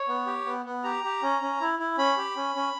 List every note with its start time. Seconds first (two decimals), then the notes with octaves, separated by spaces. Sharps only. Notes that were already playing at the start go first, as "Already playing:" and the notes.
Already playing: C#5
0.08 B3
0.27 G4
0.46 B3
0.65 B3
0.84 G4 A#5
1.04 G4
1.22 C#4
1.42 C#4
1.61 E4
1.79 E4
1.98 C#4 B5
2.17 G4
2.36 C#4
2.55 C#4